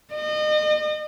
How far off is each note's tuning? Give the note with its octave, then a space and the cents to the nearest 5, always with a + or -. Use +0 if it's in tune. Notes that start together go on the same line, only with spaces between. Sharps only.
D#5 -35